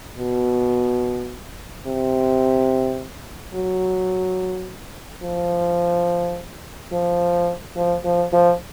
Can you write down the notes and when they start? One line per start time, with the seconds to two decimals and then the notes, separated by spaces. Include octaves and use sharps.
0.18 B2
1.86 C3
3.55 F#3
5.23 F3
6.92 F3
7.76 F3
8.05 F3
8.33 F3